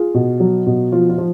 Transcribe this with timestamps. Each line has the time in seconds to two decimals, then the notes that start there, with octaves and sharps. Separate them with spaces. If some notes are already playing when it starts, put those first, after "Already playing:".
Already playing: F4 G#4
0.14 B2
0.40 F#3
0.66 B2
0.92 F3 F4
1.09 F4
1.18 F3